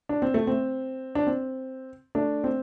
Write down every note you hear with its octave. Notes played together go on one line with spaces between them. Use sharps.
D4
C4
A3
C4
D4
C4
A3 D4
C4